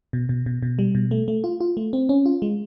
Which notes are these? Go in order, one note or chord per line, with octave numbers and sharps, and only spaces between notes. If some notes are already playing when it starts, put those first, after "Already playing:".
B2
B2
B2
B2
G3
B2
A3
A3
F4
F4
A3
C4
C#4
F4
G#3